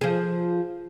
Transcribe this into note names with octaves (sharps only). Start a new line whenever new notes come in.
F3 G#4